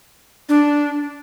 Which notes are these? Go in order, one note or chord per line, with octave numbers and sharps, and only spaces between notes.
D4